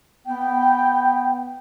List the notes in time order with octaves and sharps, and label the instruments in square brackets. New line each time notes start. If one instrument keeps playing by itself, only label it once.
[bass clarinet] B3 [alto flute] G5